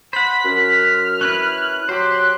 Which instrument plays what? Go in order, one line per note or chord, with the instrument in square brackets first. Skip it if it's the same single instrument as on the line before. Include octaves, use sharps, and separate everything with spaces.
[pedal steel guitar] C5 F#5 [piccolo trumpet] B5 [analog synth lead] B6
[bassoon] F#2 [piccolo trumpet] F6
[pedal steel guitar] C#4 E4 B4 [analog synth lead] F#6
[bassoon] F#3 [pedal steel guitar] G4 C5 [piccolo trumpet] C6